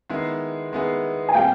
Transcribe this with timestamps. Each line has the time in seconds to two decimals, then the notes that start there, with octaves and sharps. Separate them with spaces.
0.09 D#3 G#3 B3 E4 G#4
0.72 D#3 G#3 B3 E4 G#4
1.29 G#5
1.34 A#2 G3 C4 F5 G5